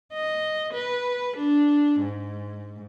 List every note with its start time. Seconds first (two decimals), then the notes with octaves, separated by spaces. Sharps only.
0.13 D#5
0.73 B4
1.37 D4
1.99 G#2